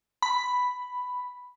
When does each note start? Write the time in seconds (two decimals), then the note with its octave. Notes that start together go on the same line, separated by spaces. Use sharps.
0.22 B5